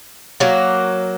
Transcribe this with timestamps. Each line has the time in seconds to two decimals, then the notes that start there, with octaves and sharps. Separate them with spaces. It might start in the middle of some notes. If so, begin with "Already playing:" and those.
0.40 F#3 A#3